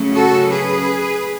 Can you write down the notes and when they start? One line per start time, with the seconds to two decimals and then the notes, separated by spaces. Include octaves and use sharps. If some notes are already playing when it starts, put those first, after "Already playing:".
Already playing: C#3 F#3 A3 C#4
0.14 F#4 A4
0.50 G#4 B4